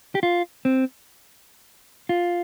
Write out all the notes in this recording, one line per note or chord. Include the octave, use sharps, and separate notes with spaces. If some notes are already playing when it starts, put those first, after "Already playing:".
G4
F4
C4
F4